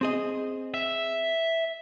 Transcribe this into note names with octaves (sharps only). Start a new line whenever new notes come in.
C4 G#4 D#5
E5